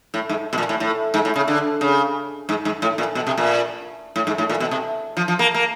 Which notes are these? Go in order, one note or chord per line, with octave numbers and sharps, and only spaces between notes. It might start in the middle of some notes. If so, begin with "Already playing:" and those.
A2
G#2
B2
A#2
A2
A2
G#2
A2
C#3
D3
C#3
G#2
G#2
A2
A#2
B2
C3
A#2
A2
G#2
A2
A#2
B2
C3
F3
F3
A#3
A#3